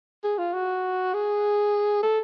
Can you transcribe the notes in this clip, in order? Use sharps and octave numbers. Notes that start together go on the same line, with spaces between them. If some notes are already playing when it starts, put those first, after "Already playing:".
G#4
F4
F#4
G#4
A4